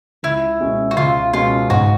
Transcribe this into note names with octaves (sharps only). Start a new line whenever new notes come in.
C#2 E4
B2 G#3 C#4
F#4
C#2 F4
B2 G#3 C#4 F4
G#2 F#4